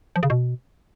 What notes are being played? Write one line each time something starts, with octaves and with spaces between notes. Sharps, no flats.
F3
C#3
B2